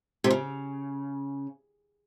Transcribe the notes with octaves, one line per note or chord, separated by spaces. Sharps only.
C3
C#3